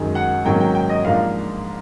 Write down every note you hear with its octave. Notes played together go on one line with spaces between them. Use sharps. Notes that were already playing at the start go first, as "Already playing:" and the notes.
Already playing: F#2 D#3 G#3
F#5
G#2 D#3 F#3 A#3 C#4 G5
G5
G5
D#5
G#2 F3 A#3 D4 F5